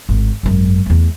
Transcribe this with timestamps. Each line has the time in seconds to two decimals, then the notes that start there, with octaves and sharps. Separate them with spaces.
0.09 G#1 A2
0.43 G#1 F#2
0.86 E2 A3